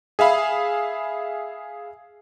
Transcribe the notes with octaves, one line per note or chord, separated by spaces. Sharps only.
G#4 E5 F5 B5